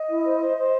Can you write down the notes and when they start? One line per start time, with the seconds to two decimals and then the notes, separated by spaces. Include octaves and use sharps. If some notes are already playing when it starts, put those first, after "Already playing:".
Already playing: D#5
0.09 E4
0.24 C5
0.40 C5
0.56 C5